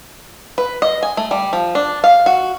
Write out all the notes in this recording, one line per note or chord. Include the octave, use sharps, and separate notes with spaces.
B4
D#5
G#5
A3
G3
F3
D4
F5
F#4